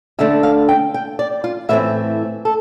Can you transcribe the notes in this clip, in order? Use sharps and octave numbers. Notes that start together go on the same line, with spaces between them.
D2 D3 A3 D4 E5
F5
G5
G5
D5
F4
A2 E3 A3 C4 E5
A4